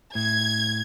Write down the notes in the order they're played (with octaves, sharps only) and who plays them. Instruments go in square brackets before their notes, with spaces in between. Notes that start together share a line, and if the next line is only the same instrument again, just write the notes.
[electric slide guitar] A2 [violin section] G#6